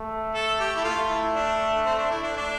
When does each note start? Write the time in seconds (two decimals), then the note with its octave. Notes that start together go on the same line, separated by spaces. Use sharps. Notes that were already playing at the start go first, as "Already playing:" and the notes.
Already playing: A3
0.35 A4
0.60 G4
0.75 E4
0.84 A3 F4
1.10 E4
1.35 D4
1.86 C4
1.98 D4
2.11 E4
2.23 D4
2.36 D4